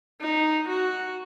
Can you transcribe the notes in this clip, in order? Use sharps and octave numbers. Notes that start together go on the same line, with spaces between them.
D#4
F#4